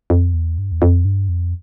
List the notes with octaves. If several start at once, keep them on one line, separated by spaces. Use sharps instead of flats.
F2
E2
G2
E2
F2
G2
F2